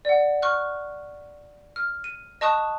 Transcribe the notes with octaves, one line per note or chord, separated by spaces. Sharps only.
D5 F#5
C#6 F6 F#6
F6
D#7
D#5 A5 C#6 D#6 F#6 E7